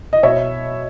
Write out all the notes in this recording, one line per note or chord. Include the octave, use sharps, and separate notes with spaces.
D#5
B2 C#5 E5